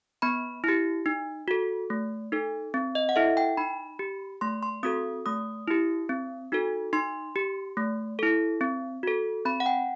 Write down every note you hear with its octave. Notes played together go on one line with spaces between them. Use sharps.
B3 B5
E4 G4
D#4
F#4 A4
A3
D#4 A4
C4
D#5
F#5
E4 A4 E5
G5
D#4 B5
G4
A3 C6
C6
C4 F#4 A4 D#6
A3 D#6
E4 G4
C4
D#4 F#4 A4
D#4 C6
G4
A3
E4 A4
C4
F#4 A4
C4 B5
F#5
G5